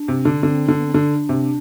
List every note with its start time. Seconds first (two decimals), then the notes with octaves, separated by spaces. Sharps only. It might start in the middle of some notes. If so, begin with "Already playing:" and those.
Already playing: D4
0.08 C3
0.25 D3
0.42 D3 C4
0.69 D3
0.78 B3
0.86 C4
0.94 D3 D4
1.29 C3